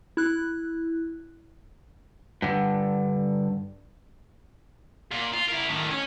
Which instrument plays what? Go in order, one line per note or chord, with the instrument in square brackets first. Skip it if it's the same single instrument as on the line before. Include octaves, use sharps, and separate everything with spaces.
[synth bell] E4 F#6
[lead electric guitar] G2 D3
[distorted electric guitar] A#2
F4
E4 A#4
A2 D#3
C#4